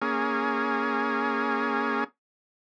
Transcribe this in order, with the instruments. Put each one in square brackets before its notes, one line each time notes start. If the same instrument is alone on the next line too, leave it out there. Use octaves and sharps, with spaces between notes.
[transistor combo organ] A#3 C#4 G#4